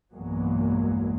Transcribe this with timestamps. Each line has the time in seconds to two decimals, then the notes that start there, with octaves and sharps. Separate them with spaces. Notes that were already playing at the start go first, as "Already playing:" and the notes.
0.15 B1 E2 G2 F#3 G#3 A#3